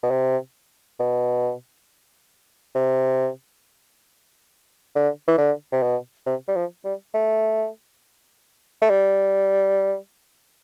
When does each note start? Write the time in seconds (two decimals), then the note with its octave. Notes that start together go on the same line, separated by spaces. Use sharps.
0.03 B2
0.10 C3
0.99 B2
2.75 C3
4.95 D3
5.28 E3
5.38 D3
5.72 C3
5.83 B2
6.26 C3
6.48 G3
6.56 F3
6.85 G3
7.14 A3
8.81 A3
8.90 G3